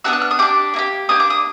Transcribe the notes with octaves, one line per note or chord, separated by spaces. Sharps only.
B3 D4 F#4 E6
F#6
F6
D#6
D4 G4 D6
A#3 D#4 G4
A#3 D4 G4 D#6
D6
D#6